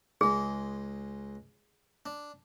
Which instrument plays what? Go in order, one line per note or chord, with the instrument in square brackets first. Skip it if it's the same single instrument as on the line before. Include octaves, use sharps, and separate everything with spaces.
[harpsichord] C#2 G#3 [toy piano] G#4
[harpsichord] D4